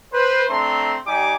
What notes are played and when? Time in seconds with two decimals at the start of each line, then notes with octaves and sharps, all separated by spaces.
0.13 B4 C5
0.49 A3 C4 D4 A#5 C6
1.07 G3 D#4 G4 G#5 D6